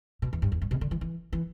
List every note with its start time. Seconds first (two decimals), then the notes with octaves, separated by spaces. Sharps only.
0.22 B2
0.33 E2
0.42 G2
0.52 E2
0.62 G2
0.71 B2
0.81 D3
0.91 E3
1.01 E3
1.33 E3